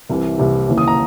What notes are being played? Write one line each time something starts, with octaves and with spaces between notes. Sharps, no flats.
C2 C3 E3
C2 C3 E3
D#2 C#3 E3
D#6
A#5